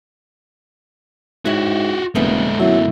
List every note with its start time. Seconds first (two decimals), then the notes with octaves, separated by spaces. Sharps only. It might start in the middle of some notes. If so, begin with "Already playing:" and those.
1.46 G#2 C#4 E4 F#4 G4
2.15 F1 D3 G#3 A#3 B3 E4
2.59 F#2 B2 F#3 E4 E5